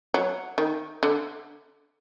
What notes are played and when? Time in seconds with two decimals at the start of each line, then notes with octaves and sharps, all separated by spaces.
0.14 F#3
0.58 D#3
1.03 D3